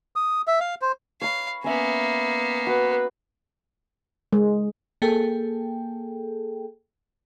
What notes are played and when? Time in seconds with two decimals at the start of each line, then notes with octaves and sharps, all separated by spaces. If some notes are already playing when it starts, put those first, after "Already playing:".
0.16 D#6
0.47 E5
0.60 F5
0.82 C5
1.21 C#5 F5 B5
1.64 A#3 B3 C#4 E5
2.67 F#4 B4
4.33 G#3
5.02 A#3 G#4 A4 G5